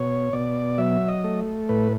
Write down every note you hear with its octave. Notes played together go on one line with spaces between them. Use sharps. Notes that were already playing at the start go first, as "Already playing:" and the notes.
Already playing: B2 C#5
B2 D5
F#3 E5
D#5
A3
A2 B4